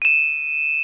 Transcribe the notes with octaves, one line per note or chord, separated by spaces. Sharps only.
D#7 E7